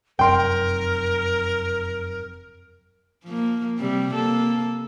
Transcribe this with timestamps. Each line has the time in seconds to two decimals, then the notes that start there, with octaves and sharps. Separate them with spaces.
0.19 F1 F#2 C3 A#4 G5 C6
3.24 F3 A#3
3.78 C3 G3 C4
4.14 A#3 A4